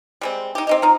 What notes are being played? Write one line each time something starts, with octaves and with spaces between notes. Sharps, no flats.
G3 G#3 C4
D#4 G4
C4 D#4 G4 D#5
F3 D#4 A#5